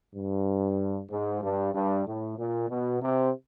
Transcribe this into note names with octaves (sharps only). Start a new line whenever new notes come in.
G2
G#2
G2
G2
A2
A#2
B2
C3